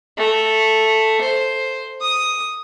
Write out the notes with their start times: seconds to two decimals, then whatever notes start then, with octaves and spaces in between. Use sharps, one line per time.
0.18 A3
1.21 C5
2.01 D#6